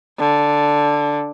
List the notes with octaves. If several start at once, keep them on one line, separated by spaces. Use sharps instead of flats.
D3